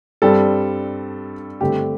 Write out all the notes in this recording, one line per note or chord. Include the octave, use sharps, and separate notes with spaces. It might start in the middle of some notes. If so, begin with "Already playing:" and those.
G2 G3 C4 A4
G2 D3 A3 C4 G4